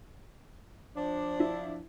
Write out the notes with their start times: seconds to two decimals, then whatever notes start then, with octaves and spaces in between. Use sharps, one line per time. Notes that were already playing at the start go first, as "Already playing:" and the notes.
0.96 F3 D4
1.40 E4